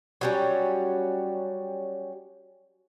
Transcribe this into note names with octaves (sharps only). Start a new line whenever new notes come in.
F#3 G3 C#4